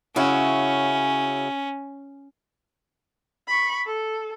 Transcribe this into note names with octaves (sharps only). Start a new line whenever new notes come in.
C#3 C#4 E4 F#4
B5 C#6
A4